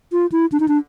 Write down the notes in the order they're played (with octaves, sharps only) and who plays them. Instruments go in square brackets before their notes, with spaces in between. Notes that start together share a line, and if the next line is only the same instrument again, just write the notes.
[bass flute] F4
E4
D4
D#4
D4